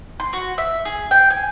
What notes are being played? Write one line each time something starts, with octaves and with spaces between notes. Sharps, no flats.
C6
F#4
E5
G#4
G5
G#5